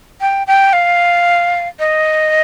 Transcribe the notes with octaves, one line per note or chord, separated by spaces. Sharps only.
G5
G5
F5
D#5